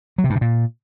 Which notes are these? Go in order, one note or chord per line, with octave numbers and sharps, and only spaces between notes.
F#3
C3
G2
C3
A#2